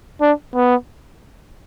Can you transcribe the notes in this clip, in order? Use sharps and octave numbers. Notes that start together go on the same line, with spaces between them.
D4
B3